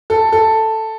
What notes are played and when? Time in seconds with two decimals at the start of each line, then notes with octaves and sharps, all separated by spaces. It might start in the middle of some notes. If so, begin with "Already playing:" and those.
0.10 A4
0.32 A4